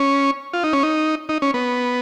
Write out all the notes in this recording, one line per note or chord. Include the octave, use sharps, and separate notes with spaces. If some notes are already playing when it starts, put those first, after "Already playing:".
Already playing: C#4
F4
D#4
C#4
D#4
D#4
C#4
B3